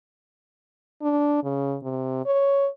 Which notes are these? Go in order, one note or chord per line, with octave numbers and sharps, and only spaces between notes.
D4
C#3
C3
C#5